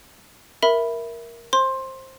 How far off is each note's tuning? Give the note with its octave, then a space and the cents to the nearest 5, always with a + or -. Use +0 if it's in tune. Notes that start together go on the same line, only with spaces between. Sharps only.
A#4 +5 E5 +0 B5 +0
C5 +15 C6 +15